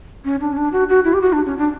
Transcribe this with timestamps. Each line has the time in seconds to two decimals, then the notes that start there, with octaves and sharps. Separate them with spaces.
0.25 C#4
0.41 D4
0.52 C#4
0.57 D4
0.72 F#4
0.89 F#4
1.04 E4
1.13 G4
1.22 F#4
1.33 D4
1.46 C#4
1.58 D4